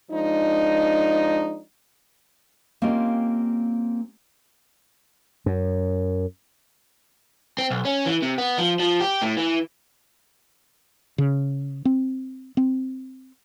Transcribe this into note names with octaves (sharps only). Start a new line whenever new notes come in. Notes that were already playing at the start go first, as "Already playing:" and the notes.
F3 G#3 D4 D#4
A#3 C4 C#4 F4 G4 D#5
F#2
C4
B1
C#4
E3
C3
B3
F3
F3
G4
A2
E3
C#3
C4
C4